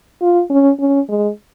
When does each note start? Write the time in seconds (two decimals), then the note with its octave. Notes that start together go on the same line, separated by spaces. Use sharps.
0.22 F4
0.50 C#4
0.80 C#4
1.09 G#3